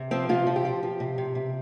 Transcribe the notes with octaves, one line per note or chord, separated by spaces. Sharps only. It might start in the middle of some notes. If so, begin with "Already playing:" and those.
Already playing: C3
F3 C4
C3 F4
F3
G4
F3
F3
C3
C3
C3